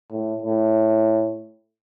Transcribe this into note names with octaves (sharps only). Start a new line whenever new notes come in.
A2
A2